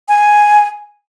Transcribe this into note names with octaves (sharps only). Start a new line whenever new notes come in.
G#5